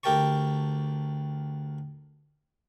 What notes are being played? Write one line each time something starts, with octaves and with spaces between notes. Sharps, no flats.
D2 G4 A#4 G5 A5 C#6